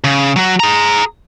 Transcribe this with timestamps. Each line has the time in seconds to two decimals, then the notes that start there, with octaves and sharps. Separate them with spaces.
0.04 C#3
0.36 F#3 F#4
0.60 G#4 A#5